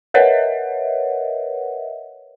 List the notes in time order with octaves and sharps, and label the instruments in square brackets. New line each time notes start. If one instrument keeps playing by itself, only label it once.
[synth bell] A#4 B4 C#5 D#5 E5 F#5